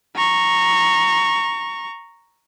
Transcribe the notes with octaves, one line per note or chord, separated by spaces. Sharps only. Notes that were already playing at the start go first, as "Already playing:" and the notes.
A#5 C#6